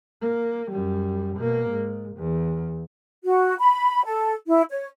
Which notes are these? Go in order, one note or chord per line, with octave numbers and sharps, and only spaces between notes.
A#3
F#2 G3
B2 A#3
G#2
E2
F#4
B5
A4
E4
C#5